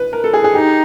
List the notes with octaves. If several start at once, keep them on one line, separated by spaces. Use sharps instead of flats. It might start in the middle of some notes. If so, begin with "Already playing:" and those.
Already playing: B4
A#4
A4
G#4
G#4
D#4 G4